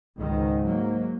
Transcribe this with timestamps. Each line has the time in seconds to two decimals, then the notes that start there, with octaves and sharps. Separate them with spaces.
0.18 C#2 G#2 D#3
0.63 F#3 A#3